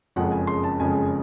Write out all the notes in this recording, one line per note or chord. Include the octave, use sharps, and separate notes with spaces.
F#1 F2 C#3 F3 G#3 F#5
G#5
C6
A5
F#1 F2 C#3 F3 G#3 G#5